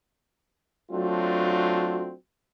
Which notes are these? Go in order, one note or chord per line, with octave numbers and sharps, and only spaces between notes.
F#3 A3 C4 D4 F4 F#4